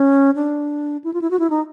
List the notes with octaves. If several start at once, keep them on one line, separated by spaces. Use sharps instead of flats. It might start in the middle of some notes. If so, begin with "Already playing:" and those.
Already playing: C#4
D4
E4
F4
E4
F#4
E4
D#4